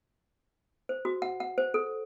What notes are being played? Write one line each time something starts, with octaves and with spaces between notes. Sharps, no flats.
C5
F#4
F#5
F#5
C5
A4